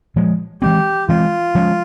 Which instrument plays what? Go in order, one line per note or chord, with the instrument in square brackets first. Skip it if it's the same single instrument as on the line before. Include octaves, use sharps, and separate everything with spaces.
[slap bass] A#2 F3 G#3
[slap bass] E3 G#3 C4 [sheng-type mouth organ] G4
[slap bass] E3 G#3 C4 [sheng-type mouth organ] F4
[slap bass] F3 G#3 C#4